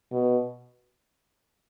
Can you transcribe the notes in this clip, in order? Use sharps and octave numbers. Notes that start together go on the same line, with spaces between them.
B2